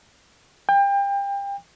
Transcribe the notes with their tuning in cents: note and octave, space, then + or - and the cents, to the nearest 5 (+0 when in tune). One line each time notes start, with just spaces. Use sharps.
G5 +30